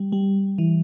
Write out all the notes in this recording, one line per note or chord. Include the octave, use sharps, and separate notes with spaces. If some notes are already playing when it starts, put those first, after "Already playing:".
Already playing: G3
G3
E3